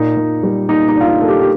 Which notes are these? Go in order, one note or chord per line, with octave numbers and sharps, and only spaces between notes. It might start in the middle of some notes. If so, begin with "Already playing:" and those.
Already playing: A#2 D#4
A#2
G3
A#3 D#4
D#4
D4
F4
D#4
A#3 A4
G4
G4